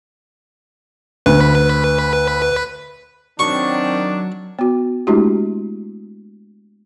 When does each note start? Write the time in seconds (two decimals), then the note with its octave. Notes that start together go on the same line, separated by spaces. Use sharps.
1.26 D2 B4
3.39 D#3 F#3 C4 D4 C#6
4.59 B3 F#4
5.07 G#3 A3 D4 E4 F#4 G4